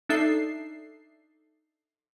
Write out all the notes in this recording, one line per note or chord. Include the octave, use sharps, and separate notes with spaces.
D4 D#4 A4 E5 C7